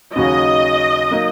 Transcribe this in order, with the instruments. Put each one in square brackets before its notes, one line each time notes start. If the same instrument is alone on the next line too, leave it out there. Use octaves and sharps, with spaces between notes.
[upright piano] D#2 C#3 F#3 C#4 F#4 [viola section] D#5
[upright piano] F#3 A#3 D#4